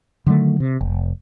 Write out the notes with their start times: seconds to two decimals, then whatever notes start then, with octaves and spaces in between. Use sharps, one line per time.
0.26 D3 D#3 F#3 A3
0.60 C3
0.81 F1